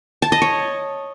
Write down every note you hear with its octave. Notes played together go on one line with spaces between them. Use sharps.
A5
D#5
C#5